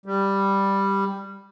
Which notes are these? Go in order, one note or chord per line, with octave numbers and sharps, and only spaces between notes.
G3